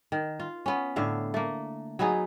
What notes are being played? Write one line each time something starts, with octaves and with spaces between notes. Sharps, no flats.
D#3
F4
B3 C#4
A2 D3 E5 F5
A3 A#3
F#3 B3 D#4 G#4